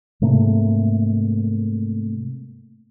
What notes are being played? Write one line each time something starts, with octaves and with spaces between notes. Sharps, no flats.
G#2 C3 A3 A#3